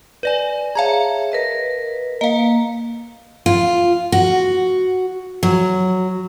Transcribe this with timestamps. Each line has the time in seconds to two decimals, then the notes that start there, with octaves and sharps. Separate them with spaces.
0.23 B4 D5 G#5
0.75 G#4 C#5 E5 F5 A5 A#5
1.32 A#4 B4 D#5
2.21 A#3 D#5 F5
3.46 F4
4.12 F#4
5.43 F#3